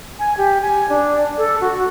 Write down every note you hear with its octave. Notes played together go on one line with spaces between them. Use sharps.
G#5
G4
G#5
D4
A4
F#4